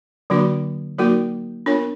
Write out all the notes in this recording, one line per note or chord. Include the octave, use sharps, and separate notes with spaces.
D3 F#3 A#3 D4 F#4
F#3 A#3 D#4 F#4 A#4
B3 D4 F4 A#4 C#5